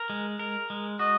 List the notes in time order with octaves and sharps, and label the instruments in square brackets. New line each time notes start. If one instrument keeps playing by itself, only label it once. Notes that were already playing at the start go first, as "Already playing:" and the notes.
Already playing: [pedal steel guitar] A#4
G#3
A#4
G#3
[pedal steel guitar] F#4 [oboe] D#5